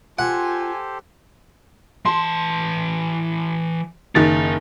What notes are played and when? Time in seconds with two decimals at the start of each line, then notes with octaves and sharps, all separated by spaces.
0.19 F4 G4 A4 C5 F#5 G#5
2.05 E3 A5 C6
4.15 F#1 D#3 D#4 A6